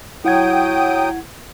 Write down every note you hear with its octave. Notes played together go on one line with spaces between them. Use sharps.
F#3 E4 F#5 G5 D#6 G#6